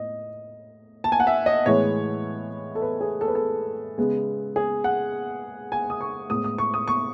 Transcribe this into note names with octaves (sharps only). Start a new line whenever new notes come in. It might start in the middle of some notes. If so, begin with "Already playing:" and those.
Already playing: A2 D#5
A5
G#5
F#5
E5
D#5
A2 E3 G#3 B3 C#5
A4
B4
G#4
A4
B4
A4
C#3 G#3 B3
G#4
F#5
G#5
D#6
C#6
A2 G#3 B3 D#6
D#6
C#6
D#6
C#6